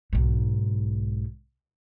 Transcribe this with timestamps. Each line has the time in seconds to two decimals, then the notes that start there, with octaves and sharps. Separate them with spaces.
0.13 B1 G#2